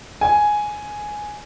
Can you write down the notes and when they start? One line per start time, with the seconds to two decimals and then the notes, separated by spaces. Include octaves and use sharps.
0.21 G#5